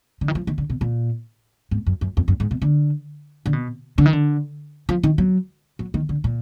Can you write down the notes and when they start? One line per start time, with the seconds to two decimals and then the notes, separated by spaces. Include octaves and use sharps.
0.21 D3
0.28 D#3
0.35 F3
0.47 D#3
0.58 D3
0.70 B2
0.81 A#2
1.71 G#2
1.87 F#2
2.01 F#2
2.17 F2
2.28 F#2
2.40 G#2
2.51 B2
2.62 D3
3.46 D3
3.53 B2
3.98 D3
4.06 D#3
4.13 D3
4.89 F3
5.03 D#3
5.18 F#3
5.79 F#3
5.94 D#3
6.09 D3
6.24 A#2